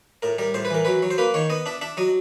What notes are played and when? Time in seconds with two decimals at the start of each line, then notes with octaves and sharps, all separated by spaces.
0.22 A2 A#4
0.38 G3 A#4
0.54 A2 C5
0.65 B4
0.70 E3 A#4
0.85 F#3 B4
1.03 F#3
1.11 C5
1.18 A#3 B4
1.34 D#3 C#5
1.50 B3 D#5
1.66 D4 E5
1.81 D4 E5
1.97 F#3 D#5